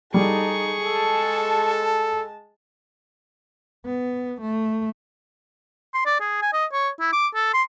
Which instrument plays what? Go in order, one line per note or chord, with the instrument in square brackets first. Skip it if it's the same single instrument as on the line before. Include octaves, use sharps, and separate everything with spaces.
[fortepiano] G3 [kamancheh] D#4 A4 [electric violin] G#4 C#6
[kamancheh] G#3 A5 [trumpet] A4
[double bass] B3
A3
[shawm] C6
D5
G#4
G#5
D#5
C#5
E4
D6
A4
C6